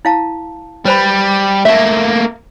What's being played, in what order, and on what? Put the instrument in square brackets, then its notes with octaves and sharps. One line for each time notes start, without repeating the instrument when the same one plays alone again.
[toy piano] E4 F5 A5
[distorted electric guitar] G3 [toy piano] B4 C5 B5
[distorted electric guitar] A3 A#3 [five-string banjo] E5 A5